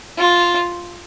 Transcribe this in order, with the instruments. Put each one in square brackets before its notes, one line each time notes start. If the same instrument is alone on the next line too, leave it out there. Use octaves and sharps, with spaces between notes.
[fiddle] F4